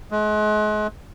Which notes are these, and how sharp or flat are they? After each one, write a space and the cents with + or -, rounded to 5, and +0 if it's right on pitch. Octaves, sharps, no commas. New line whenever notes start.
G#3 +35